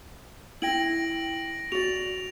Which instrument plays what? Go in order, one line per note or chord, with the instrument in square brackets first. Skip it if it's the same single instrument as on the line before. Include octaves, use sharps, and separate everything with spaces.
[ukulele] E4 G5 [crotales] A#6 D7 F#7
[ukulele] F#4 D5 [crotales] F7